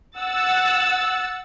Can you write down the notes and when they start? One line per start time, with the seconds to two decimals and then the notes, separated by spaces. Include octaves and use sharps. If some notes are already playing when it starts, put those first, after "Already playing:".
0.17 F#5 E6 A6